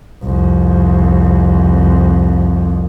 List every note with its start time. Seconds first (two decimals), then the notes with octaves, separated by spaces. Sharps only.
0.23 C2 F2